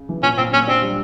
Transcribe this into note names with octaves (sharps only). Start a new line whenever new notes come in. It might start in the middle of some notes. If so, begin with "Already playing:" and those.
Already playing: C#3
E3
A#2 C#4
A#2 C4
A#3 C#4
C4 D4
G3